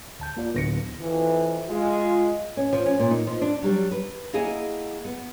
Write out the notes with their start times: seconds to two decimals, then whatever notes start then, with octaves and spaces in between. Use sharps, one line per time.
0.20 D2 A5 G6
0.37 A#3 F4 D5
0.55 D1 B3 A#6 C#7
1.00 F2 E3
1.69 G#3 F4
2.57 C#4
2.73 F3
2.86 C#4
2.99 A#2
3.11 D#4
3.27 F3
3.41 D4
3.63 F#3 G3 D4
3.91 B4
4.33 A#3 E4 G#4 D#5 F#5 G#5
5.05 B3